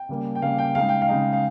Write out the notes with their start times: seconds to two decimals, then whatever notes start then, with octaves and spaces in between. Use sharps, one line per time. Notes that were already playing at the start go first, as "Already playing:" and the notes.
Already playing: G5
0.09 C#3 G3 A#3
0.35 G5
0.42 C#3 G3 A#3 F5
0.58 G5
0.75 C#3 G#3 D#4 F5
0.89 G5
1.02 F5
1.09 C#3 G#3 D#4
1.33 F5